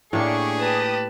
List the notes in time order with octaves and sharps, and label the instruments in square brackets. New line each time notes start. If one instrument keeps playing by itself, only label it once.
[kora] A2 A#3 [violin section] D4 G4 C#6 [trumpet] G#4
[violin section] G4 D#6 [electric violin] B4 A5